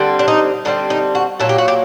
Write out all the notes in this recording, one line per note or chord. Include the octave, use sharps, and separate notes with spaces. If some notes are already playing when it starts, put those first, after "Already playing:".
Already playing: D3 G3 C4
D4
D#4
D3 G3 C4 D#4
D#4
F#4
A#2 F#3 A#3 A4
G4
F#4
G4